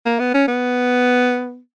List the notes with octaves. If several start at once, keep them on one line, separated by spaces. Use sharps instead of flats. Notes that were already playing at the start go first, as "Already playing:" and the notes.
A#3
B3
C#4
B3